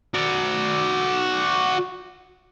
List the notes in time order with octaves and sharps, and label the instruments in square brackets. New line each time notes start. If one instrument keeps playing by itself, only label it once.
[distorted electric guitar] F#4 D5